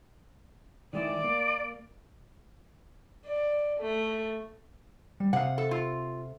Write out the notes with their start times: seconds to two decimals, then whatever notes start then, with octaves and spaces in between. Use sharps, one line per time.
0.93 D#3 G#3 E4 D5
1.24 A#3
3.25 D5
3.80 A3
5.20 G3
5.33 C3 F5 F#5
5.58 A4
5.71 F4